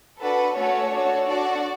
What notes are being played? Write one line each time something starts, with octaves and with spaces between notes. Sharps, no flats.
D4 F#4 A4 B4
A3 C#4 F#4 A4 C#5
D4 F#4 A4
D4 F#4 A4 D5